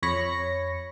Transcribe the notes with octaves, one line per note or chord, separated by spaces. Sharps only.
F2 C#5 B5 A#6 C#7